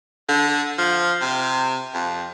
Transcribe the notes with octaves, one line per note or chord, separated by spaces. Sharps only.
D3
F3
C3
F2